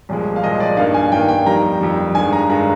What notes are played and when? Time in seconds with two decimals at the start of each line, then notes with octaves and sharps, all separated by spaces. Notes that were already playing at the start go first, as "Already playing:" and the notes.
0.09 C2 A#2 F3 G#3
0.36 F5
0.43 C2 A#2 F3 G#3 D#5
0.60 D5
0.77 G2 D#3 A#3 F5
0.94 G#5
1.12 G2 D#3 A#3 G5
1.28 G5
1.46 F2 D#3 G3 A#5
1.81 F2 D#3 G3
2.15 G2 D#3 G#3 G#5
2.33 A#5
2.50 G2 D#3 G#3 A#5